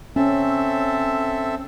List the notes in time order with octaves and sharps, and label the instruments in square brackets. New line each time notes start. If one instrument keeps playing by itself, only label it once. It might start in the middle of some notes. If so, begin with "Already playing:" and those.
[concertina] C4 A4 E5 [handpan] C#4